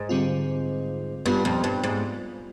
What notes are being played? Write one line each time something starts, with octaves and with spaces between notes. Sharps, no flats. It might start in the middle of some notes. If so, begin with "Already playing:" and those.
Already playing: G#2
D3 G3 C4 F4
G2 G3 B3 F4
F2
G2
G#2